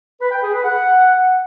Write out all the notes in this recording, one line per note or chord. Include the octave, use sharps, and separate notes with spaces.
B4
G5
G#4
B4
F#5